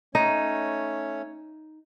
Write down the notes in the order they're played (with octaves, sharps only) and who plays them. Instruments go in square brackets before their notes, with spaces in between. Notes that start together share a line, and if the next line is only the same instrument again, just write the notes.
[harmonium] A3 C#4 C#5 [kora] D#4